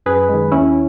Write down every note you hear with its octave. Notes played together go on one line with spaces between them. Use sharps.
F#2 G#4 B4
D#3 G#3
D#2 C#4 E4